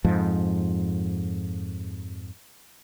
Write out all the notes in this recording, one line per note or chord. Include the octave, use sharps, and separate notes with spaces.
F2 G#2 F3